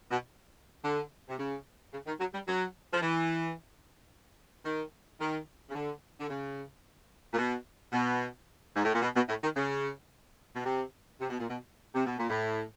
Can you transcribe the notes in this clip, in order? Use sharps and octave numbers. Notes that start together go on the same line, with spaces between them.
B2
D3
C3
C#3
C#3
D#3
F#3
G3
F#3
F3
E3
D#3
D#3
C#3
D3
D3
C#3
A#2
B2
B2
G#2
A2
A#2
B2
B2
A2
D#3
C#3
B2
C3
C3
B2
A#2
B2
C3
B2
A#2
A2